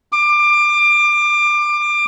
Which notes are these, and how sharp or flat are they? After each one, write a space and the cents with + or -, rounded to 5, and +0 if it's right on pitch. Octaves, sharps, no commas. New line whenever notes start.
D6 +25